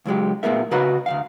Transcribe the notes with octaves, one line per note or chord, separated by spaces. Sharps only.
C#2 F#3 G#3 G4
A#2 A3 B3 G#4 A#4 E5
C#3 F#4 B4 D#5 A#5 B5
D2 B2 F5